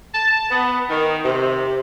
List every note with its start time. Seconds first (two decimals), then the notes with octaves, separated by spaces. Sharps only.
0.14 A5
0.51 B3
0.90 D#3
1.24 C3